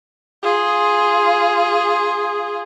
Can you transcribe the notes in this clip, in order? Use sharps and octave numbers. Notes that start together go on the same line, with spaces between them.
F4 G#4